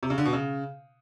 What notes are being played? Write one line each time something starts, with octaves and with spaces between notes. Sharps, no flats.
C3
C#3
D3
B2
C#3